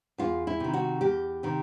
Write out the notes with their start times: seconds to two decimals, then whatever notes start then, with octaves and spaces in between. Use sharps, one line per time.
0.18 E2 F4
0.47 E4
0.60 C3 D#3
0.74 F#4
1.01 E2 G4
1.43 C3 D#3